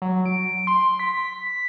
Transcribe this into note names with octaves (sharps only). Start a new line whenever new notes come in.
F#3
D7
C6
B6